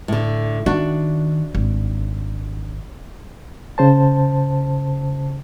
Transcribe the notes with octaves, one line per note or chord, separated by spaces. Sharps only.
A2 D3
D#3 D4 F#4
G#1
C#3 C5 A5